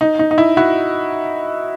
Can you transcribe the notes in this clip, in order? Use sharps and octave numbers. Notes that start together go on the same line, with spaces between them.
D#4
D#4
D#4
E4
E4 F#4